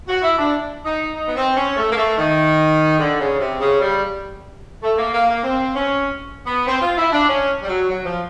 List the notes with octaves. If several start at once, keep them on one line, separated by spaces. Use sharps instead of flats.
F#4
E4
D4
D#4
D#4
B3
C4
C#4
A3
A#3
A3
D#3
D3
C#3
C3
C#3
G3
A3
A#3
A#3
A#3
C4
C#4
B3
C4
F4
E4
D4
C#4
G3
F#3
F#3
F3